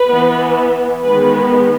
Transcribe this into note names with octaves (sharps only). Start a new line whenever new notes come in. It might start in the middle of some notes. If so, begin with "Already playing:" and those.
Already playing: B4
E3 B3
D#3 G#3 B3 B4